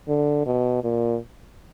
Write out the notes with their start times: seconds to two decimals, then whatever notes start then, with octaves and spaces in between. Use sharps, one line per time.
0.08 D3
0.46 B2
0.84 A#2